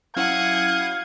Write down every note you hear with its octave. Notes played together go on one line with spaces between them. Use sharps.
F#3 C#4 E4 F5 F#5 D#6 G#6